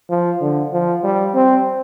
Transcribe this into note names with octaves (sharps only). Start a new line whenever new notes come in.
F3
D3
F3
G3
C4